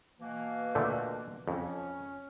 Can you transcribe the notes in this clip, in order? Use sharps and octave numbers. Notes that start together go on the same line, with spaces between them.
B2 E3 A#3
A#2 D3 A3
F2 C#4